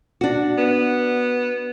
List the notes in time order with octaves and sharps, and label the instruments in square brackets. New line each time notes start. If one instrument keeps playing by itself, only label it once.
[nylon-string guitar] D4 F#4
[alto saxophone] B3